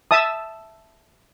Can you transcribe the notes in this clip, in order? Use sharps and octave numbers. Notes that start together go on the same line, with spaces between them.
E5 A5 D#6